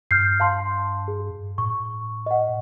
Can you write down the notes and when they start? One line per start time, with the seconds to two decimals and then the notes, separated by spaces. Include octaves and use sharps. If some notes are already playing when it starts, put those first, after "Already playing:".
0.11 G2 F6 G6 C7
0.40 F5 A5 C6
1.08 G#4
1.58 A2 C#6
2.26 D#5 F#5